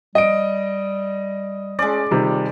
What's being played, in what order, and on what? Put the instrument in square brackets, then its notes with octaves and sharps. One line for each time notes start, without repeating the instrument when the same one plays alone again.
[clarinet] G3 [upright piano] D#5 D7
[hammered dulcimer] G#3 D5 [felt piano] C#4
[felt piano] C3 D#3 G3 [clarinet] F4